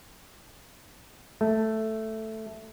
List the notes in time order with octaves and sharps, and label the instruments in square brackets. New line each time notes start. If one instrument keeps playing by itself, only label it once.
[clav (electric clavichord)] A3